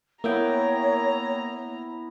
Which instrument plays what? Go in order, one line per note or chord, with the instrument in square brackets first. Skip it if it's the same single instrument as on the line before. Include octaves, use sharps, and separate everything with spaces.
[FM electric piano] A#3 G5 [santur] B3 E4 E6 [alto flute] C#5 [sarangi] A#5